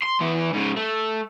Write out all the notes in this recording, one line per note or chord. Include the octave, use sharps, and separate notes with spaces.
C6
E3 B3
G#2 C#3
A3